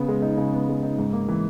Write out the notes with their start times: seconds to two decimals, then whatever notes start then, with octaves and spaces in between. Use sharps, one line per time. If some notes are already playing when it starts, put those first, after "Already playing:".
Already playing: C#3 B3
0.08 G#3
0.22 D#4
0.38 C#3
0.53 B3
0.69 G#3
0.83 D#4
0.99 G#2
1.13 A#3
1.28 E3